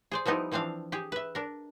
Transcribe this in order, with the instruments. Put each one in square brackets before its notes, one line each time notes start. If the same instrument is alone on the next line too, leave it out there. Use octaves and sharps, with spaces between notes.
[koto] G#4 C5 D5
F3 G3 B3 D#4 E4
E3 F3 C4 D4 F5
G4 G#4
B4 E5
D4 A#4